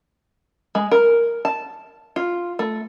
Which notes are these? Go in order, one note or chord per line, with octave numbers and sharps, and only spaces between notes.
G#3
A#4
A5
F4
A3